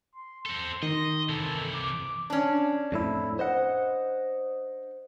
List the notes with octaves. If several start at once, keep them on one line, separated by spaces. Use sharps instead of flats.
C6
C4 A4 C6
D#3 D#5
C3 E3 A4
D6
C#4 D4
F2 A2 E4
C5 D#5 F#5